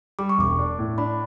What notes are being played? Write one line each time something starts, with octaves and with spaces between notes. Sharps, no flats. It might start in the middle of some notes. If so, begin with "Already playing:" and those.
G3 D6
C#6
E1 D6
D4
A2
D4 B5